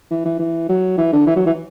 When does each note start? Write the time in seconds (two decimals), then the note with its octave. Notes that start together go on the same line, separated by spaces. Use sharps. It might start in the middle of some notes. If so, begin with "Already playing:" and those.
0.11 E3
0.25 E3
0.39 E3
0.69 F#3
0.98 E3
1.13 D3
1.27 E3
1.36 F#3
1.46 E3